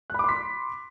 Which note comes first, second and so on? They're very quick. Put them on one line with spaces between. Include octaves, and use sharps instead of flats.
F#6 B5 D6 C6 B6